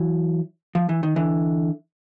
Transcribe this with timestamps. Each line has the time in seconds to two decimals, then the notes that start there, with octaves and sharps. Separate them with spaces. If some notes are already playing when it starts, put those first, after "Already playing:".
Already playing: E3 F#3
0.75 F3
0.89 E3
1.03 D#3
1.16 D3 E3